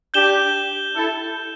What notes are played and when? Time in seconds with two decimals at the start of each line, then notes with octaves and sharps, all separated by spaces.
0.14 D4 G4 G6 E7 G7
0.96 E4 A4